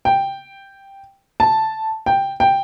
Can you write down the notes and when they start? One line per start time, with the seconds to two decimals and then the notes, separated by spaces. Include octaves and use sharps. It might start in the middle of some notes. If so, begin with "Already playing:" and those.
0.05 G5
1.40 A5
2.06 G5
2.40 G5